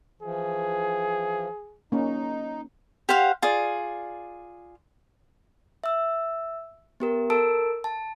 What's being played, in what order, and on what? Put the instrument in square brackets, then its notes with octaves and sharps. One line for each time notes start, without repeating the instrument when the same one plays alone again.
[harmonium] E3 F3 [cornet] G#4
[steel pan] A#3 C#4 [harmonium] D#4
[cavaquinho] G4 C5 F5 F#5
F4 G#4 D5
[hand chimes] E5 E6
B3 G4 A#4
A4 A#4 A5 E6 D7
A5